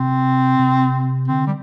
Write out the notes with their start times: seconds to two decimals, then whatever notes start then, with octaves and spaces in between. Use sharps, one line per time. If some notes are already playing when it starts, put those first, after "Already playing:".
Already playing: C3 C4
0.59 C3
1.28 D3 C4
1.47 G3